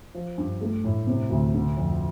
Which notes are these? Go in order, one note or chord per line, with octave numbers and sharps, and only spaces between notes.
F3
G2
A3
A2
C3
D2
D3
F2